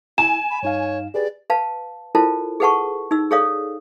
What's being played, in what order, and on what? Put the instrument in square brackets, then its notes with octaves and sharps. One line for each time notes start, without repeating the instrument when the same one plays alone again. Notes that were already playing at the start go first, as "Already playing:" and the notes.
[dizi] E4 [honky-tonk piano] G#5 [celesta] E7
[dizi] B5
[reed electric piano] G2 D#4 F5 [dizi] C#5
[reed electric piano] G4 G#4 B4 [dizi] D5
[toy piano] B4 F5 A5
E4 F4 A4 A#4 C5 A5
G#4 A4 B4 F#5 A5 C#6
D#4 E6
G#4 A4 C#5 D5 F5 D#6